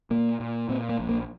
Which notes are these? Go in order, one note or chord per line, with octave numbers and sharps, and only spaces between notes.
A#2 A#3
A#2
A#2 C4
A#3
A#1
A#3